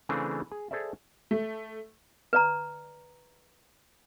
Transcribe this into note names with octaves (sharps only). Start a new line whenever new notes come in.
C#3 E3 A3 C4 D4 G#4
G#4
G#4 A4 C5 D5 E5
A3
B4 D5 A#5